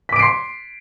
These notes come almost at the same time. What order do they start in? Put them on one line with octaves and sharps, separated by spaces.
B6 D6 D7 C7 C6